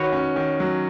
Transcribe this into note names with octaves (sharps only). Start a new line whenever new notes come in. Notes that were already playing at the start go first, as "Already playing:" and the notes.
Already playing: D#3 F#4 B4 C#5
C#4
D#3
F#3